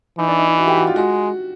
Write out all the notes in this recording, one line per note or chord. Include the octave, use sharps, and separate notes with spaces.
E3 D#4
D4
D#4
E4
F#4
G4
F#4
F4
G#3 F#4